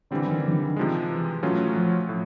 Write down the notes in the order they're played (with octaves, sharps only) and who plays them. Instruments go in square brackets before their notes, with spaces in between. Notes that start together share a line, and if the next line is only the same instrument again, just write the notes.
[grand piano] D3 [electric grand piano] E3 G3 C4
[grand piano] D#3
D3
D#3
[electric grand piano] C3 F3 G#3
[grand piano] E3
[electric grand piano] A2 F#3 A3 C#4 F4
[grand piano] F3
[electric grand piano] A2